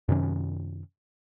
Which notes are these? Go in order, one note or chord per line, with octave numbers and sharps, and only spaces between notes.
F#2 C3 D#3 C#4